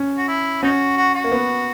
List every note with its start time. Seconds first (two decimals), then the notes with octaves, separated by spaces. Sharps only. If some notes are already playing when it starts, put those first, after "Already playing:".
Already playing: C#4
0.18 F#4
0.28 E4
0.63 C#4 D#4 F#4
0.97 F#4
1.15 F#4
1.24 A#3
1.32 B3